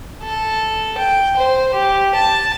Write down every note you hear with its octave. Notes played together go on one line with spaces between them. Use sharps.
A4
G5
C5
G4
A5